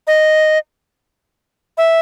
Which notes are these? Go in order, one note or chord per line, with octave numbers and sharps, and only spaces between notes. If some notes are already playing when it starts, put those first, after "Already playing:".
D#5
E5